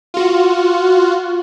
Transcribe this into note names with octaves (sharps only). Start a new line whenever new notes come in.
F4 F#4